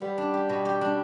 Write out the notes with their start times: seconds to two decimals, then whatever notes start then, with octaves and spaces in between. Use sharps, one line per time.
0.02 G3 B3
0.18 D4
0.34 G4
0.49 B2
0.65 G4
0.81 D4